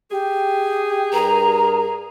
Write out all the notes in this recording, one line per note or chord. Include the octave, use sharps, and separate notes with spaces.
G4 G#4
G2 A#4 A#5